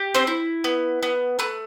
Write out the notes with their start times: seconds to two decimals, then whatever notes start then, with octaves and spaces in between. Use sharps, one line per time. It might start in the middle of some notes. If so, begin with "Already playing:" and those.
Already playing: G4
0.15 C4 C5
0.27 E4
0.64 B3
1.03 B3
1.39 A3 B4